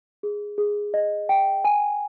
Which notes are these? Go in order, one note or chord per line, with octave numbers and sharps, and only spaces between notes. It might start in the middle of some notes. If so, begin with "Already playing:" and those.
G#4
G#4
D#5
G5
G#5